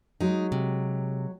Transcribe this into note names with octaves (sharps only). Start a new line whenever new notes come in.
F#3 G#3 D#4
C3